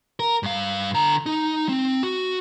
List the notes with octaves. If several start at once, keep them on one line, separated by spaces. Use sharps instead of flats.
A#4
G2 F5
D3 A#5
D#4
C4
F#4